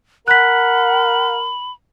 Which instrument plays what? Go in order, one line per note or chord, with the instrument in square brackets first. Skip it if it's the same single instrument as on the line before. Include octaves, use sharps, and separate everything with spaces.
[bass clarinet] A#4 [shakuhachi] F#5 [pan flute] B5 [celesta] F#6 B6